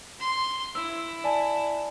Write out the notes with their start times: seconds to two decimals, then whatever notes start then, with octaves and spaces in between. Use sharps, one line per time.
0.20 C6
0.75 E4 E6
1.24 D5 G#5 A5